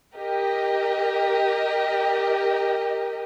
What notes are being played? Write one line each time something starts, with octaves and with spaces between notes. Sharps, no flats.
G4 A#4 D#5